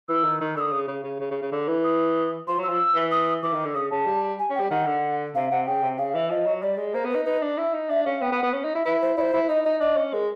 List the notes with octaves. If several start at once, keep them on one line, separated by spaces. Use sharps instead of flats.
E3 E6
D#3
D#3
D3 D#6 E6
C#3
C#3
C#3
C#3
C#3
C#3
D3
E3
D#6
F3 C6
F#3
E6
F3
E3
D#6
E3 D6
D#3
D3
C#3 D#6
C#3 A5
G3
G#5
C#4
G3 G5
D#3 F#5
D3
C3 F5
C3 F#5
C#3 G5
C3
C#3 F5
E3 E5
F3 D#5
F#3
G3 D5
G#3
A#3 C5
B3
B4
D#4
D#4 B4
D4
E4
D#4
D4 E5
C#4 F5
B3 G5
B3
F#5
B3
C#4
D#4
E4
E4 B4
C5
E4 C5 D5
E4
D#4 D#5
D#4 D#5
D4 D#5
C#4
G#3 A#4